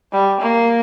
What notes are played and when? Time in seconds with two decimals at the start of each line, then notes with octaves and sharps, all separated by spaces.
0.13 G3
0.41 A#3